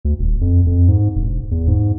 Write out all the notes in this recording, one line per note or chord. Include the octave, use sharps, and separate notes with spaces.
D2
D#1
F2
F2
G#2
E1
E2
G#2